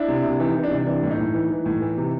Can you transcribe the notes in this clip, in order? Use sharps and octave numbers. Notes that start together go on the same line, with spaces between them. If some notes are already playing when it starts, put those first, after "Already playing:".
Already playing: D4 E4
C3
C3
E3 D#4
E3 D#4
D4
C3 D#4
E3 D4
A2
D#4
A2
E3
E3
A2
E3
C3